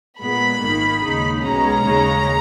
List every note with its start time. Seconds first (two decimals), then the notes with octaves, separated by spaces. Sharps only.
0.19 A#2 G#3 B3 B5
0.61 G#1 G#2 D#3 A#3
1.02 D#2 C#3 G#3 D#4
1.43 B1 B2 G#3 C#4 A#5
1.84 D#2 C#3 G#3 C#4